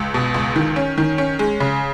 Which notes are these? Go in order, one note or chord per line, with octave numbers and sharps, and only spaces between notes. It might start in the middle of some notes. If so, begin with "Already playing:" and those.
Already playing: C#2
B2
C#2
D#3
C#4
D#3
C#4
G#3
C#3